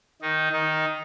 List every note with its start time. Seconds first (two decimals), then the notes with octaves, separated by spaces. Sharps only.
0.21 D#3 D#4
0.52 D#3 D#4